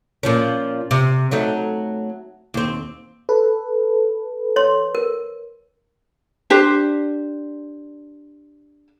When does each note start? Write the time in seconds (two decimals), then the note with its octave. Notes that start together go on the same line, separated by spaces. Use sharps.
0.23 A#2 F3 C#4
0.91 C3
1.31 F#3 A3 D#4
2.54 D#2 C4
3.29 A4 B4
4.56 C#5 C6
4.95 A#4
6.50 D4 G4 C5